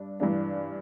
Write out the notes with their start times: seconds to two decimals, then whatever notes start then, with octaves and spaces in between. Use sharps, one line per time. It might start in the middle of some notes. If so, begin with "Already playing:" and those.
Already playing: G2 D4
0.20 G2 E3 G3 D4